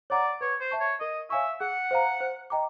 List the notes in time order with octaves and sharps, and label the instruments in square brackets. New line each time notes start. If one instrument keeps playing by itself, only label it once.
[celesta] C#5 F#5 A#5 D6 [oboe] D5
[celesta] B4 [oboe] C#5
[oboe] C5
[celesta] E5 A5 C#6
[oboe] C#5
[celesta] A#4 [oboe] D#5
[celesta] C#5 F5 G#5 C#6 [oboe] E5
[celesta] G#4 [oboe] F#5
[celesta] C5 F5 A#5
C5
D#5 G5 A#5 D6